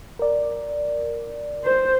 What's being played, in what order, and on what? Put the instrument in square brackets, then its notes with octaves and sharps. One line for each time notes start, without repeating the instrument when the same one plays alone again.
[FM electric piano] A#4 D5
[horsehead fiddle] C5